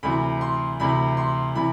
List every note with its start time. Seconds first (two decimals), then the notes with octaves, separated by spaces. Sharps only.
0.03 D2 C3 E3 B5
0.41 C6
0.79 D2 C3 E3 B5
1.17 C6
1.55 C3 E3 B5